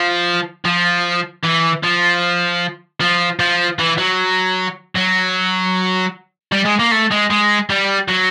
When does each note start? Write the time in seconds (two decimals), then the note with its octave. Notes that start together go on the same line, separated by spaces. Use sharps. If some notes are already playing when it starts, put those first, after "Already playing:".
Already playing: F3
0.65 F3
1.44 E3
1.84 F3
3.01 F3
3.40 F3
3.79 E3
3.98 F#3
4.95 F#3
6.52 G3
6.65 G#3
6.79 A#3
6.91 A3
7.11 G#3
7.30 G#3
7.70 G3
8.09 F#3